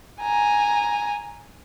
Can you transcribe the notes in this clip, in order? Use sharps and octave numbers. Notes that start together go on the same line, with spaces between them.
G#5 A#5